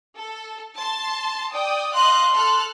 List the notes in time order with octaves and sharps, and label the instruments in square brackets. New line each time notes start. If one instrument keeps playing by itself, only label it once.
[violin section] A4
A5 C6
D5 G5 D#6
[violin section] D#5 F5 F#6 [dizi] C6
[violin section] A4 F6 F#6